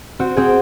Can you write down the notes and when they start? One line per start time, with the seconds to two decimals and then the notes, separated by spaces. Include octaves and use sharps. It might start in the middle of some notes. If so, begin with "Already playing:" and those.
0.19 C4 F#4
0.36 C4 G#4